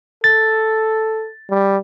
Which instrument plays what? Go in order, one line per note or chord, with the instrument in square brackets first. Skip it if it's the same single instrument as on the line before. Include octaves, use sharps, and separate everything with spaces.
[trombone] A4 [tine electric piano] A6
[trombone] G3